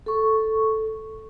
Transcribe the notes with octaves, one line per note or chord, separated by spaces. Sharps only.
A4 C#6